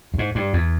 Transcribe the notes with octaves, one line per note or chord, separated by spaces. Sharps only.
G2
G#2
G2
E2